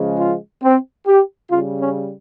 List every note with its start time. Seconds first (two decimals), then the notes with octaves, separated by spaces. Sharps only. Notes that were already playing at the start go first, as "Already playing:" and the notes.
Already playing: C#3 F3 G#3
0.18 F4
0.63 C4
1.07 G4
1.51 C#3 G3 F4
1.81 C#4